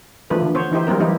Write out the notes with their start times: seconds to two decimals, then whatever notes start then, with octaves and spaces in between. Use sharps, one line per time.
0.30 E3 F3 A3 A#3 D4 B4
0.42 D3
0.55 B3 C5 C#5
0.72 E3 D#4 E4 G4 C5
0.87 F#3 G3 A#3 C4 A#4
1.00 E3 A#3 D#4 E4 G4